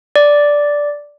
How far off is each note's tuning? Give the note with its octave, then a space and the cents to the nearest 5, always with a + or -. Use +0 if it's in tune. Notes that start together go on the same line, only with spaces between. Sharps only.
D5 -5